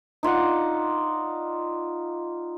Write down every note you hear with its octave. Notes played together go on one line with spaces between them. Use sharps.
D#4 F4 D5 F#5